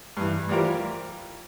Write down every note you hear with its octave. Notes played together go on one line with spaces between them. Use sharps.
G2 E3
E3 G3 F4 G4 A#4 C5